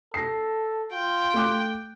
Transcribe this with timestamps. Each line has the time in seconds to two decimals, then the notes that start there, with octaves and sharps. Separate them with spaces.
0.14 A4 A#6 C7
0.93 F4 G5
1.34 A3 D6 F#6